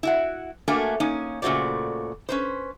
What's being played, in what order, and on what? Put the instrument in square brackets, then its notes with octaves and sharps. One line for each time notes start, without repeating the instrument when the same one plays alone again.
[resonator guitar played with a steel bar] E4 F#4 F#5
A3 A#3 D4 F#4 A#4 G#5
A#3 C#4 D#4
A#2 C#3 A3 F#4 C5 D5
C#4 B4 C5